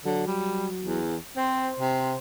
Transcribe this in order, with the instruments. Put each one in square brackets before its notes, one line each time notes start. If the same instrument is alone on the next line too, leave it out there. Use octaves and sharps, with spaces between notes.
[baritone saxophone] D3 [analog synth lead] F#3
[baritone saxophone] G3
E2
[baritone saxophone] C4 [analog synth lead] C5
[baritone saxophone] C3